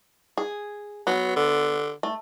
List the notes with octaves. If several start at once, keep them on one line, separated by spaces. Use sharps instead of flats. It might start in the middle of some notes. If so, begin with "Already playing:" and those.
G#4
F#3 B3
D3
A3